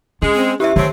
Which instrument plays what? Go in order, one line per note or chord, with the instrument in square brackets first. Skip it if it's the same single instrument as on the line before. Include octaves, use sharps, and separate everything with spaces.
[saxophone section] G#3 [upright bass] C#4
[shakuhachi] C4
[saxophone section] E2 [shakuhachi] E4 [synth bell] G4 E5
[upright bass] D#3 [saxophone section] A3 C4 [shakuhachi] C#5